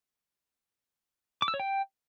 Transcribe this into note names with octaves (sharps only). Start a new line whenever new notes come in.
D6
E6
C#5
G5